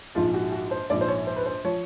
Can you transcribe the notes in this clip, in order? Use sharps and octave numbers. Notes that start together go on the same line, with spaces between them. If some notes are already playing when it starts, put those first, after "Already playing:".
A#1 G#2 F3 F4
F#4
F#4
C5
A#1 G#2 F3 D5
C5
C#5
C5
B4
C5
F3 C#5